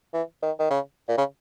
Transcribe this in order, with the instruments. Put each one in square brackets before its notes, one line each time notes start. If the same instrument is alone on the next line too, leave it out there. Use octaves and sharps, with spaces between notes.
[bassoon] E3
D#3
D#3
C#3
A#2
C#3